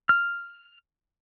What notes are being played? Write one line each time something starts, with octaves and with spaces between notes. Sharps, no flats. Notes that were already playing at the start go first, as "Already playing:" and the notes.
F6